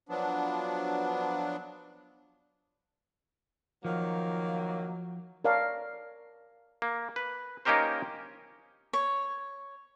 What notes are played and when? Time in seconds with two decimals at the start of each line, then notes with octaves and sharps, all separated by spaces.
0.09 F3 F#3 B3 D4
3.85 D#3 F3 F#3 A#3
5.44 A#4 C#5 D5 F5 A5
6.82 A#3
7.16 B4
7.65 A#3 C#4 D#4 G4 A#4 C5
8.93 C#5